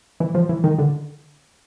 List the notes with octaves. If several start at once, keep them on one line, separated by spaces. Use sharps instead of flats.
E3
F3
E3
D#3
D3